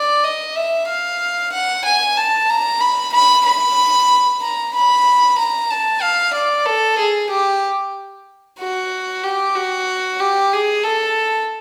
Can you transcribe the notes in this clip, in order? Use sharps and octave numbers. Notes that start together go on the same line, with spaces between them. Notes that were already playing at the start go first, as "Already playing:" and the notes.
Already playing: D5
D#5
E5
F5
F#5
G#5
A5
A#5
B5
B5
B5
A#5
B5
A#5
A5
F5
D5
A4
G#4
G4
F#4
G4
F#4
G4
G#4
A4